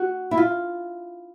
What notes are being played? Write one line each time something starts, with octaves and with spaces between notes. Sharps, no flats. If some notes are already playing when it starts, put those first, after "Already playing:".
Already playing: F#4
E4
F4